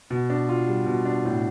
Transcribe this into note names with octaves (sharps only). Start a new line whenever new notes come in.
B2
D4
F4
G3
B2
D4
A2